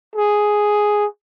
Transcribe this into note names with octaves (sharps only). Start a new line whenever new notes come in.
G#4